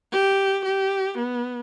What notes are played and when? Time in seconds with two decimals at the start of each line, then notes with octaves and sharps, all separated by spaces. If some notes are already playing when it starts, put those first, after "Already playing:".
0.13 G4
0.65 G4
1.18 B3